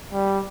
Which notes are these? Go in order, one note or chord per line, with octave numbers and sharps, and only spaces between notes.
G3